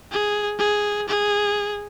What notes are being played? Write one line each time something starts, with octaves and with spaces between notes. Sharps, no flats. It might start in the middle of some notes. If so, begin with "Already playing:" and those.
G#4
G#4
G#4